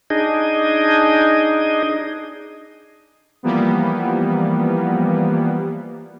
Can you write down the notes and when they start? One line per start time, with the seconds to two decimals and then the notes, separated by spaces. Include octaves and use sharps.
0.10 D4 D#4 G#4 D#5
3.43 E3 F3 G3 A#3 B3